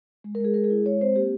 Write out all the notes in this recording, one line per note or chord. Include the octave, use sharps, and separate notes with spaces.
G#3
A#4
G#3 G#4
G#3 A#4
G#4
E4
G#3 C#5
C4 C5
A#3 G4